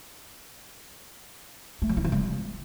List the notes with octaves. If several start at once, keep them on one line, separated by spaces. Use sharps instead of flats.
A3
F#3
E4
F3
G3